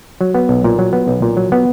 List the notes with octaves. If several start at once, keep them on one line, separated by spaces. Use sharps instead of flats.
F#3
B3
B1
A#2
F#3
B3
B1
A#2
F#3
B3